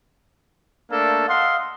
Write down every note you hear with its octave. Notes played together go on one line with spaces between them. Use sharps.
A3 A#3 D4 A4
D#5 F5 F#5 C6